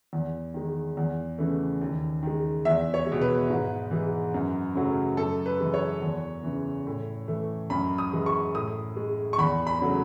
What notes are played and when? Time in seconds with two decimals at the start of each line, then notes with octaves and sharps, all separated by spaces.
0.13 E2
0.54 D#3 G#3
0.97 E2
1.38 C#3 E3 A3
1.81 D#2
2.23 D#3 G#3
2.65 E2 E5
2.94 C#5
3.07 G#3
3.12 B2
3.21 B4
3.50 G#2
3.91 E3 G#3
4.34 F#2
4.75 C#3 F#3 A3
5.17 F#2 A4
5.46 B4
5.60 E3 G#3
5.74 C#5
6.02 E2
6.43 C#3 E3
6.87 A2
7.28 E3 A3
7.70 F#2 B5
7.98 D#6
8.13 E3 G#3
8.26 C#6
8.55 A2 D#6
8.96 G#3
9.33 C#6
9.38 E2 B5
9.67 B5
9.81 C#3 F#3 A3